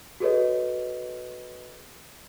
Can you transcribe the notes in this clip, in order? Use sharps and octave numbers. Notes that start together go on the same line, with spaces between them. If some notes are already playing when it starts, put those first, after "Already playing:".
F#4 G#4 A4 B4 C#5 D#5